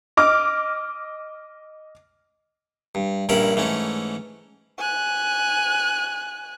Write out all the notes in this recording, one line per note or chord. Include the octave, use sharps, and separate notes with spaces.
D#5 D6 F6
G2
A#1 G2 C#4 E4 A#4 B5
G#2 E3 A3 C#4
G#5 F#6